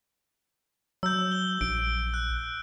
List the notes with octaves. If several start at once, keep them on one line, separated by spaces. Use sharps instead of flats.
F#3 E6 G6
G7
A#1 D7
F#6